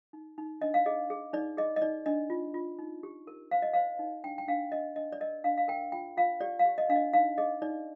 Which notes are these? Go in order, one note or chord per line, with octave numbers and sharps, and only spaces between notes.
D#4
D#4
D4 D#5
F5
G#4 D#5
G#4
D#4 D5
G#4 D#5
D#5
D#4 D5
D4 D#5
F4
F4
D#4
G4
A#4
C5 F5
D#5
C5 F5
D#4
D4 G5
G5
D4 F5
D4 D#5
D4 D#5
D5
A#4 D#5
D4 F5
F5
A#4 G5
F4 G5
F4 F5
G4 D5
F5
G4
D#5
D4 F5
D#5
D#4 F5
G#4 D#5
D#4 D5